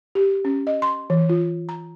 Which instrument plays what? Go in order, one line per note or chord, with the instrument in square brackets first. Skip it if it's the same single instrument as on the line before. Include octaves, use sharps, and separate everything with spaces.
[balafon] G4
C#4
D#5
C6
E3
F4
A#5